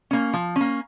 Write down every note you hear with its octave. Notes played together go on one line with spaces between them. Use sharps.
A#3 C#4
F3
A#3 C#4